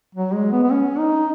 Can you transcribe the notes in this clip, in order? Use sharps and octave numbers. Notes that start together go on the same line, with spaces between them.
F#3
G#3
B3
B3
C#4
D#4